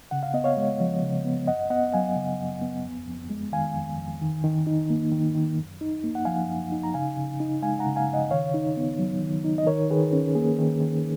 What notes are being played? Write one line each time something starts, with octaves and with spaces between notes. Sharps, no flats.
C#3 F#5
F5
B3 D#5
C#5 F5
G#3
F3
C#3
B3
F#2 D#5 F#5
B3 D#5 F#5
F#3 F5 G#5
C#3
F#2
B3
F2
F2
G#3
D#3 F5 G#5
F2
F2
D#3
D#3
D#4
A#3
D#3
D#3
F#2
D#4
A#3
F#5
F3 F5 G#5
F#2
D#4
A#5
C#3 F5 G#5
C#3
D#4
G#3 F5 G#5
F#5 A#5
C#3
F5 G#5
C#3
D#5 F#5
D#3 C#5 F5
D#4
B3
F#3
D#3
D#4
D#5
D#3 A#4 C#5
D#3 G#4 B4
C#4
A#3 G#4
D#3
D#3